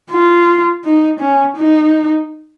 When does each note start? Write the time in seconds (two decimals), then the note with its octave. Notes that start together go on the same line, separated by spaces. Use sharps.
0.11 F4
0.84 D#4
1.19 C#4
1.57 D#4